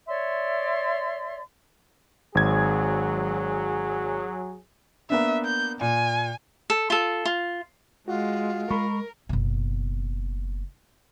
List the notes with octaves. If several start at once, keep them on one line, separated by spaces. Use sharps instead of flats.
C#5 D5 E5 C6
G#1 F#3 G#4 G#6
A#3 B3 D4 E5
G6
A#2 G#5
A4
F4 A4
F4
G#3 F4 F#4 F#5
G#3 A#4 B5 C#6
F#1 B2